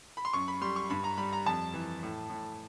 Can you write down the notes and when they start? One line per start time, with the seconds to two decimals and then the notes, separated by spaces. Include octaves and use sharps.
0.17 B5
0.25 C6
0.33 F#2 C#6
0.48 B5
0.61 G3 C6
0.76 C#6
0.90 G2 B5
1.04 A#5
1.17 G3 B5
1.33 A#5
1.46 F2 A5
1.74 E3
2.03 A2
2.30 A2